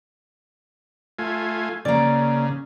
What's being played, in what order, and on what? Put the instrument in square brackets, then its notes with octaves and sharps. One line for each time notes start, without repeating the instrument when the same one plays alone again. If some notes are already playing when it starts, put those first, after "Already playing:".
[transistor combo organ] A3 F4 G#5
[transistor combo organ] C#3 [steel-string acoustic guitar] A#3 D5